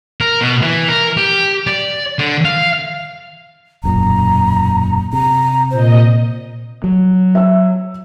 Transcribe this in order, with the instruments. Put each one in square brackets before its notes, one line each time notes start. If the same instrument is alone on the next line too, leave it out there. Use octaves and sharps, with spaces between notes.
[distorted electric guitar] A#4
B2
E3
A#4
G4
D5
D3
F5
[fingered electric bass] E1 F#2 A#2 [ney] A#5
[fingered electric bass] C3 [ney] A#5
[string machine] A#2 D#5 [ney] C5
[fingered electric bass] F#3
[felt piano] E5 E6